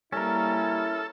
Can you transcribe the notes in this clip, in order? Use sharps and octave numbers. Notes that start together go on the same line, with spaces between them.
G3 A#3 C#4 E4 A4 A#4